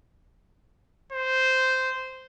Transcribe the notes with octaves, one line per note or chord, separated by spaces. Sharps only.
C5